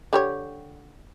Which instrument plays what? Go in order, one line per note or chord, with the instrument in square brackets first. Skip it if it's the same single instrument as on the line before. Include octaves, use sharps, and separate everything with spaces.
[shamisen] D3 G4 C#5